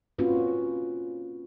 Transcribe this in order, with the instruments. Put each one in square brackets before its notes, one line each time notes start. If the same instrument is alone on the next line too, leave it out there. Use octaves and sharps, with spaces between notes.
[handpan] A#3 C4 C#4 F4 F#4 B4